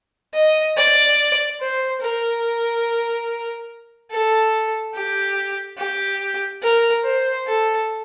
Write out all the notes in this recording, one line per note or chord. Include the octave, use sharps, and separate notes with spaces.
D#5
D5
C5
A#4
A4
G4
G4
A#4
C5
A4